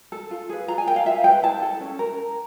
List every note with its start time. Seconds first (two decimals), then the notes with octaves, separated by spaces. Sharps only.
0.12 A4
0.31 F4
0.49 G#4 B4
0.68 F4 A#5
0.78 G#5
0.87 A#4 G5
0.96 F5
1.06 F4 E5
1.24 G#4 B4 G5
1.43 E4 A5
1.62 A4
1.81 C#4
1.99 A#4